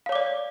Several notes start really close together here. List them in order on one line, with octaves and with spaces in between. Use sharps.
F5 C#5 D6 D5